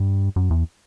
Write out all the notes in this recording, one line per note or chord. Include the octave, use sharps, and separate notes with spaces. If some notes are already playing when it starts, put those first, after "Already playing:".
Already playing: G2
F#2
E2